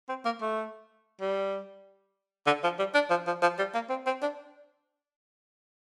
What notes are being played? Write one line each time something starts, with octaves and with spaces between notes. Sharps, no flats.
C4
A#3
A3
G3
D3
F3
G3
D4
F3
F3
F3
G3
A#3
C4
C4
D4